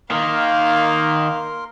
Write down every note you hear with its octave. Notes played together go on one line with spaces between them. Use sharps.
D#3 A#3 A#4 F5 C6